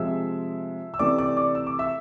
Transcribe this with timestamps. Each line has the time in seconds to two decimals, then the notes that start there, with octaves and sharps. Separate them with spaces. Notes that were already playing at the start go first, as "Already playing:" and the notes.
Already playing: C3 F3 G#3 E5 E6
0.94 E6
0.99 C3 E3 A3 D5 D6
1.18 D5 D6
1.36 D5 D6
1.55 E6
1.67 D6
1.79 E5 E6